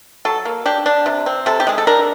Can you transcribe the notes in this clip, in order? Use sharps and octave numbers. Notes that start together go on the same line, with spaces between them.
F#3 A4
A#3
D4 G4
D4
C3
C4
C3 A4
G4
G#3 G#4
A4
D4 A#4